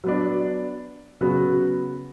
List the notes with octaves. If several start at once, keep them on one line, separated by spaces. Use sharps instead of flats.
F#3 B3 D4
C#3 F#3 B3 F#4